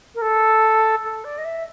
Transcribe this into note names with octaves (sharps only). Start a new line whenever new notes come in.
A#4
A4
A4
D5
D#5
E5